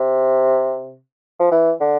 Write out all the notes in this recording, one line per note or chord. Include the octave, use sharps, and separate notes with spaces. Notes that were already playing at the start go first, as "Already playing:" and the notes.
Already playing: C3
F3
E3
D3